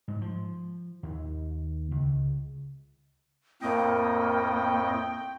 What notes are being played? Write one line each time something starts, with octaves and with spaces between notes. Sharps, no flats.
G#2
F3
D#2
C#2
F2 A2 A#3 D#5 G5